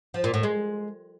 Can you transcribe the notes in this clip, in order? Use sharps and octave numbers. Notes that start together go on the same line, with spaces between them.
F3
A#2
A2
G#3